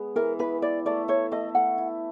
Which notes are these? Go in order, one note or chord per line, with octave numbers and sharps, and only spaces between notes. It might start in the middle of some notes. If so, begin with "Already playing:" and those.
Already playing: G#3 B3
E3 A#4
E3 B4
E4 D5
A3 D5
A3 C#5
A3 D#5
A3 F#5
E4